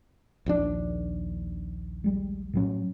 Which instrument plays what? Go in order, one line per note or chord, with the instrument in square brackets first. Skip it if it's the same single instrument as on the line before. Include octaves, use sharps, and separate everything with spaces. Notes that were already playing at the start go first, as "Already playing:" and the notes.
[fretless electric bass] A#1 D#2 D4
[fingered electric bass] G3 G#3
A2 F#3 C#4